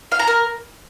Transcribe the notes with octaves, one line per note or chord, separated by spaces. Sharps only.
F5
A#5
A#4